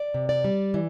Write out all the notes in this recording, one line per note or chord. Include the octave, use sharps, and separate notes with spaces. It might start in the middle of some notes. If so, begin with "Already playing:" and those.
Already playing: D5
C3
D5
G3
E3